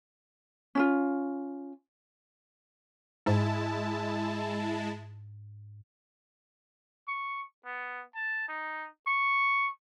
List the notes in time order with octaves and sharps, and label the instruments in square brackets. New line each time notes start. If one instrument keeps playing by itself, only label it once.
[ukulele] C#4 E4 F4
[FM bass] G#2 [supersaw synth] G#3 E4 A5
[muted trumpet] C#6
B3
A5
D#4
C#6